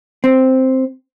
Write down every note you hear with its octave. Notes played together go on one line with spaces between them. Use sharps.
C4